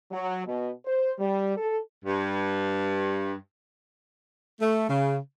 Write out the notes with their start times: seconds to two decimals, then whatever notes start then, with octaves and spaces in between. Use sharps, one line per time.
0.12 F#3
0.46 B2
0.85 C5
1.19 G3
1.57 A4
2.04 G2
4.61 A3
4.89 C#3